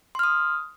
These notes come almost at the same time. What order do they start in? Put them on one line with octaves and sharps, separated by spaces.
C6 F6 D#6